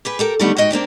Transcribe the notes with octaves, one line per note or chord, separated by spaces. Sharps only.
G4 G#4 B4
G4 A4 A#4
D3 D#3 G3 A3 B3
G#2 F#4 D#5 G5
A#3 C4 D4 G4